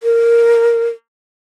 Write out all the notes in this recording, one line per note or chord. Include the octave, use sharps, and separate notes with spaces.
A#4